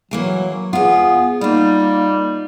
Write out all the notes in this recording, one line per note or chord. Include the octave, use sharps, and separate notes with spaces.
E3 F#3 A#3 G#4
E2 B3 F4 G#4
G3 A#3 D#4 F4